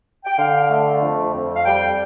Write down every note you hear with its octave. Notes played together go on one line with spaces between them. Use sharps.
G5
D3 F5
A3
F2
F2
F5
G3 G5